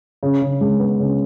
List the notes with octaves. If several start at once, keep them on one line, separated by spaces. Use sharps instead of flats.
C#3
C#3
G#3
B3
C#3